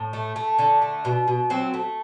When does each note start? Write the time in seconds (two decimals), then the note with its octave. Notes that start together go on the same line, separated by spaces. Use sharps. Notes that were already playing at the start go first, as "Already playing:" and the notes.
Already playing: A2
0.13 A3
0.36 A3
0.59 D3
0.82 A3
1.05 B2
1.28 B2
1.50 F#3 C4
1.74 A3